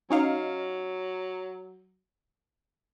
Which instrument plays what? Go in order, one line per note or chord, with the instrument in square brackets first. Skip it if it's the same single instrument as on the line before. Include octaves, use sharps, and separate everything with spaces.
[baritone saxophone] F#3 [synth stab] C#4 D#4 F5